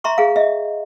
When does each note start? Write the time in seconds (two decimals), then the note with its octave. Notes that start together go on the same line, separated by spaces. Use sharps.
0.04 E5 A#5 C6 C#6
0.18 G#4 F5
0.36 D#5 E5